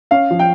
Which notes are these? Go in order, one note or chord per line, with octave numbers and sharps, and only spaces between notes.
C#4 F5
F3
G5